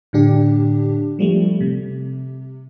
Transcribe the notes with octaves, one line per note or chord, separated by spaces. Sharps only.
A2 D3 D4 G4
F3 G3 A3
C3